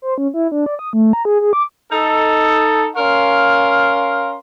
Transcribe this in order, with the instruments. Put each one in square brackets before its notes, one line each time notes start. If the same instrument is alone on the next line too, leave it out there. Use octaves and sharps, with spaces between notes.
[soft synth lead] C5
C#4
E4
D4
D5
D#6
A3
A#5
G#4
G#4
D6
[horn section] D#4 A4
C#4 A#4 F5 C6